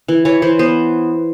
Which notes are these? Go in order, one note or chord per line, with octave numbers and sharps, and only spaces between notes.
E3
E3 C#5
E3 C5
B3 C5